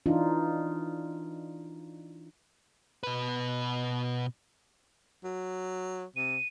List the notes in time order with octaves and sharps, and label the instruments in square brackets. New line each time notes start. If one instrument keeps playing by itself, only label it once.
[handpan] E3 D4 D#4 F4
[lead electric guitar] B2 B4
[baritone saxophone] F#3
[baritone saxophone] C3 [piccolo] D#7